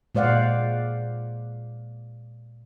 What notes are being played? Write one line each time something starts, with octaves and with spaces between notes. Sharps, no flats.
A#2 G#3 C5 D5 F5 F#5